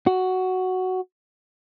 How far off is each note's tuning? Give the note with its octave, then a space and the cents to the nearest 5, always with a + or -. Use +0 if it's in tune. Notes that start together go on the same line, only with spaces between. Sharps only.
F#4 +5